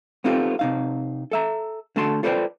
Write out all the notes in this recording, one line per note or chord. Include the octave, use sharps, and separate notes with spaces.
B3 C4 D#4 F4 G4 A4
C3 D#4 F5
A4 E5 A#5
D3 A3 F#4 A4 A5 C6
F4 A4 B4 C5 D5 G5